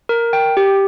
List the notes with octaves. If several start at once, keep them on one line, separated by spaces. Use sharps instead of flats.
A#4
G5
G4